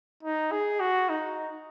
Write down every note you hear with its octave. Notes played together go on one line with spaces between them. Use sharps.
D#4
G#4
F#4
D#4